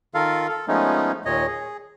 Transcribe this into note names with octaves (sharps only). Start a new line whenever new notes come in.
D#3 F4 A4 A#4 F5
A4
F3 G#3 A3 B3 C#4 D#4
D#2 A#2 C#5 D#5
G#4